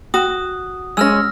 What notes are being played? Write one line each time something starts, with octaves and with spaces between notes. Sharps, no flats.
F#4 D#6
G#3 C#4 E6 F6 A#6